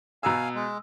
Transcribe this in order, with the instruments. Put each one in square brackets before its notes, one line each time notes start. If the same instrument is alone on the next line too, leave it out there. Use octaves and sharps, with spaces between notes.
[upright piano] B2 A#5 E6 [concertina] F5 G#5
[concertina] G#3